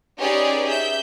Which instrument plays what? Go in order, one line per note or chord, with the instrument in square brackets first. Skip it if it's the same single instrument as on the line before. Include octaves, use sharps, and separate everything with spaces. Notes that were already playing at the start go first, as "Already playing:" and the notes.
[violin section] C#4 D#4 G4 G#4 B4 D5
E5 G6